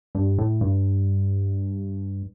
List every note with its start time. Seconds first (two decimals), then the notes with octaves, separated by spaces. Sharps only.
0.15 G2
0.38 A2
0.61 G2